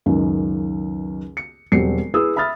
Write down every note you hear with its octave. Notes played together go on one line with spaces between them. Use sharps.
C#2 F#2 D#3
C#7
E1 F#3 G3 C4 C7 C#7
E4 G#4 B4 D#6 E6
E5 B5 D#6 F6 A6